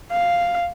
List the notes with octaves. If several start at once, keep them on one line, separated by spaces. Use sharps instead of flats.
F5